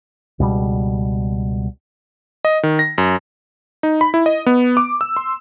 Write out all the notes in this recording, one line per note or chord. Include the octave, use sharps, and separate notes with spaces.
C#2 B2 G3
D#5
D#3
A#6
F#2
D#4
B5
E4
D#5
B3
D6
E6
C6